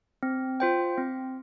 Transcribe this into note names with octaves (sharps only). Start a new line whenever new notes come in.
C4
F4 C5 G5
C4